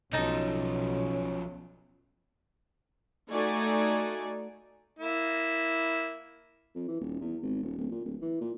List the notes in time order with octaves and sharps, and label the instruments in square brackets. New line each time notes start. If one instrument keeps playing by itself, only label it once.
[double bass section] B1 [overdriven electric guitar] C#3 F3 [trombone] C#4 [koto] D#4 A4
[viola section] A3 D#4 F#4 D5 G#5
[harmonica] A#3 E4
[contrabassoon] F2
E3
D#1
E2
G#1
D#1
D1
A#2
D1
E3
A#2